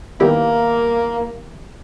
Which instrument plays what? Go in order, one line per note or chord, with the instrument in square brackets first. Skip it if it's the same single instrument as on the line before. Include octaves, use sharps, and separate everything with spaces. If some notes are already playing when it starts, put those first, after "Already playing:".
[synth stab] D#3 G3 B3 E4 G4 [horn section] A#3